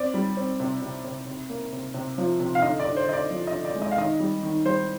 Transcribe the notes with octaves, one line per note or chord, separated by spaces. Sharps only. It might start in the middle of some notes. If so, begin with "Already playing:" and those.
Already playing: C4 D5
G3
C4
C3
C3
C3
C3
A#3
C3
C3
F3
C3
F5
D3 D#5
D5
D3
C5
D3 D#5
D5
F3
D#5
D3
D5
G#3
D#5
F5
D#3 D#5
G3
D#3
G3 C5